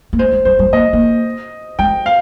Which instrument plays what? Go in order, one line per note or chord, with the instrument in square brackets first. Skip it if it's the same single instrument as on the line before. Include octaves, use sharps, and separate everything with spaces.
[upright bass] A#3
[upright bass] G#3 [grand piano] C5
[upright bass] G#3
[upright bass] G3 [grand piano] C5
[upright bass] G3
[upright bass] A#3 [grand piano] D#5
[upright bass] A#3
[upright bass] G#3 [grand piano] G5
[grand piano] F5